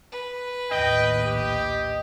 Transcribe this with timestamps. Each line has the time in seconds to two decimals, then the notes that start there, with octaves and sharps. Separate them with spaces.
0.12 B4
0.71 A#1 D#2 A2 D#5 G5
1.25 G4